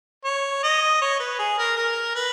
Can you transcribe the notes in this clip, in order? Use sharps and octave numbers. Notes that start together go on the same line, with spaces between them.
C#5
D#5
C#5
B4
G#4
A#4
A#4
B4